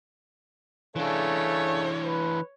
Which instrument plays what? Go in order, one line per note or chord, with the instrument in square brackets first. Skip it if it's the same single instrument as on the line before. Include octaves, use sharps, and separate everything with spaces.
[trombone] C#3 [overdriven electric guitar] E3 D4 [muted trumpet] A3 [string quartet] C#5
[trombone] B4